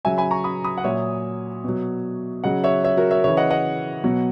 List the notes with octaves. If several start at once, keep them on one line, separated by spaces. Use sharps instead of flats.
C#3 F#3 E5 G#5
G#5 B5
A#5 C#6
B5 D#6
B5 D#6
F#5
A#2 F#3 C#5 E5
B2 F#3
C#3 F#3 D#5 F#5
C#5 E5
C#5 E5
F#4 A#4
C#5 E5
C#3 E3 C#5 E5
D#5 F#5
D#5 F#5
B2 F#3